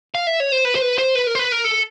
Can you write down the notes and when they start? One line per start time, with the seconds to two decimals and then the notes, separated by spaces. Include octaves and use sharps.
0.15 F5
0.27 E5
0.40 C#5
0.52 C5
0.65 B4
0.75 C5
0.82 B4
0.98 C5
1.15 B4
1.27 A#4
1.35 C5
1.39 B4
1.52 A#4
1.64 A4